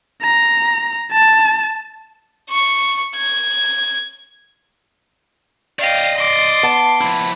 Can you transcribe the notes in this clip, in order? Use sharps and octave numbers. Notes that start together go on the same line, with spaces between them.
A#5
A5
C#6
G#6
D5 D#5 F5 G5
C6 D6
B3 A5
F3 E4